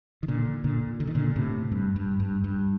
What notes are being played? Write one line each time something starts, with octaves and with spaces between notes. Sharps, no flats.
D#3
A#2 D3
A#2 D3
D3
D#3
A#2 D3
A2 C3
G2
G2
G2
G2